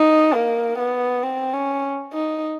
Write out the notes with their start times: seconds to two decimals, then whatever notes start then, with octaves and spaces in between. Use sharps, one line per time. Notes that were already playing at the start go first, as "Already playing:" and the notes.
Already playing: D#4
0.34 A#3
0.79 B3
1.23 C4
1.53 C#4
2.13 D#4